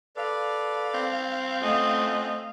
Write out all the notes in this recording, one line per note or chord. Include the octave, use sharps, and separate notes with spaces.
A4 B4 D5 F5
C4
A3 C#4 F4 D#5 F#5